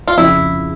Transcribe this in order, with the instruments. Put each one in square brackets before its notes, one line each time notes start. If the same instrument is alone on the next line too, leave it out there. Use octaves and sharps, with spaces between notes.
[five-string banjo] F4
[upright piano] F2 C#3 F3 [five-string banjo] E4